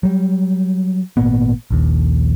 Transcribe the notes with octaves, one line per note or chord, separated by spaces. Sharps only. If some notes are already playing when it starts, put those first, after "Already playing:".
F#3 G3
G#1 A#2 A#3 B3
A#1 D#2